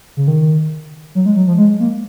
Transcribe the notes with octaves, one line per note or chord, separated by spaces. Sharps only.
C#3
D#3
F#3
G#3
F#3
F3
G#3
A#3